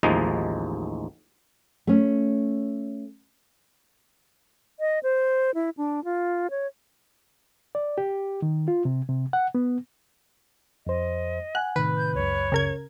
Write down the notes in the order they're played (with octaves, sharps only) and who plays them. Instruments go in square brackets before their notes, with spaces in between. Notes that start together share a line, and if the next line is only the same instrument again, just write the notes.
[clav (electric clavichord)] A1 D#2 F3 G#3 D#4
[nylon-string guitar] A3 C#4
[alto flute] D#5
C5
E4
D4
F4
C#5
[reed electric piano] D5
G4
D#3
F4
C3
C3
F#5
B3
[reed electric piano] F2 C5 [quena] D#5
[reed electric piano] F#5 G#5 [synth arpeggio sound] F#6
[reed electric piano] A2 C3 D#3 [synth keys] B4
[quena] G6
[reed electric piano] C#2 F#2 [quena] C#5
[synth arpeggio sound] C#3 A#4 G#6